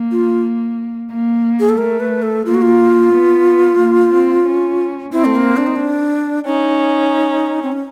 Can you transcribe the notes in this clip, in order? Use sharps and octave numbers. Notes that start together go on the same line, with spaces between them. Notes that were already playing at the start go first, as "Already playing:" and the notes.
Already playing: A#3
F4
A#3
G#4
A4
A3 A#4
B4
A4
A#3 F4
F#4
F4
B3
A#3
C4
C#4
C4 E4
A3
A#3
D4
D#4
D4
C#4 D#4
C4
C#4